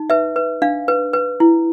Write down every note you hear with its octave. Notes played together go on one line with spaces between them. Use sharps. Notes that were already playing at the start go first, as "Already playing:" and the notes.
Already playing: D#4
B4 E5
B4
D4 F5
B4
B4
E4